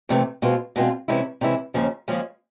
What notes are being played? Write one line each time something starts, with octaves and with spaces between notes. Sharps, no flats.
F2 C3 E3 A3
B2 G#3 C4 F4
B2 G#3 C4 F4
C3 E3 G#3 C#4 E4
C3 E3 G#3 C#4 E4
D#2 C#3 F3 G#3 C#4
D#2 C#3 F3 G#3 C#4